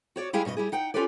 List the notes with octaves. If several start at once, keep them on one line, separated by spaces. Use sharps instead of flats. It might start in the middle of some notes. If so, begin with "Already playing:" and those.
F#4 C#5 D5
G3 G#3 E4 G4 G#4 F5
G2 B2 G#4 D#5
G3 E4 G#4
D#4 F#5 G5
C#4 F4 G4 A4 B4 D5